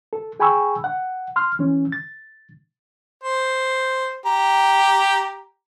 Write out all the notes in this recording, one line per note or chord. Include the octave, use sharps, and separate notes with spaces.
A4
G#4 G5 G#5 B5 C#6 E6
F#5
C6 F6
E3 C#4
A6
C5
G4 A#5